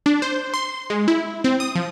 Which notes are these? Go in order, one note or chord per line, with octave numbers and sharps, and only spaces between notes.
D4
C5
C6
G#3
E4
C4
D#6
F3